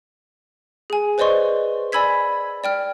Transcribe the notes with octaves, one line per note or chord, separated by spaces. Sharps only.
G#4 G#5
B4 C5 D5 D#5 C6 C#6
D5 G#5 B5 E6 G#6 B6
D5 G5 F6